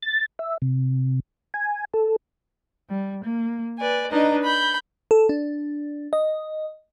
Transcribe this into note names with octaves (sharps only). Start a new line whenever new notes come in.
A6
E5
C3
G#5
A4
G3
A#3
B4 D5 G#5
D4 D#4 B4 D#5 A#5
B5 G6
A4
D4
D#5